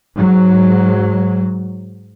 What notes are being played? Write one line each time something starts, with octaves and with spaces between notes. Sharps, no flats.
G#2 F#3